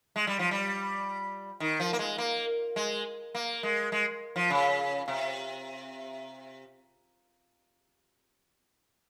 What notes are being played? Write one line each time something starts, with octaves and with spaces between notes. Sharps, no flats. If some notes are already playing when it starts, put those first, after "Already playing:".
G#3
G3
F3
G3
D#3
F3
A#3
G#3
A#3
G#3
A#3
G#3
G#3
F3
C#3
C3